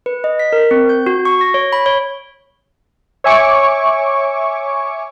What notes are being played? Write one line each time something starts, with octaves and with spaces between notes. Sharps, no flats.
B4
D#5
B6
A#4
C4
G6
F#4
C#6
A#6
C#5
B5
C#5
C#5 E5 G#5 C#6 D6